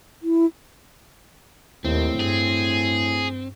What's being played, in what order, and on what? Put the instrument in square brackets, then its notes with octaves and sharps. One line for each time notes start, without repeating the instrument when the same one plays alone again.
[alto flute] E4
[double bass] D#2 [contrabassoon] A2 [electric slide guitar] C4
[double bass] G2 [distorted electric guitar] G#4